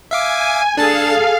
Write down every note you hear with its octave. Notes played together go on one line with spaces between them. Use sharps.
E5 F5 G#5 D6
D4 G#4 A4 F5 A5 A6